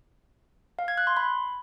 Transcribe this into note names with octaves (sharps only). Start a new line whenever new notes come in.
F5
G#6
F#6
C6
B5